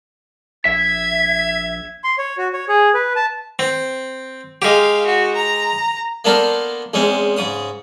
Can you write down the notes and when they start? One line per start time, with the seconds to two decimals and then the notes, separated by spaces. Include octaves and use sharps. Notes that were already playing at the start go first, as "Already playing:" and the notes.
0.65 A#1 E5 G#6
2.04 C6
2.18 C#5
2.38 F#4
2.53 C#5
2.68 G#4
2.94 B4
3.16 A5
3.59 C4
4.62 G#3 G4 F5
5.06 F#4
5.36 A#5
6.24 A#3 B3 D4 A4 A#4 C5
6.94 E2 G#3 C4 C#4
7.37 G#2 C#3 D#6